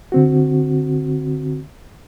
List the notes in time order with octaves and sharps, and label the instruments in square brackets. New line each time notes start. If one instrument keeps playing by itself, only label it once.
[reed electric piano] D3 C4 F#4